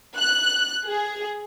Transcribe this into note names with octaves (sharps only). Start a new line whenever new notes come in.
F#6
G#4